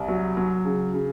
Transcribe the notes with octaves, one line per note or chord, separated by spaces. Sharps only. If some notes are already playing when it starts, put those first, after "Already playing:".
Already playing: C2
F#3
F#3
C#3
C#3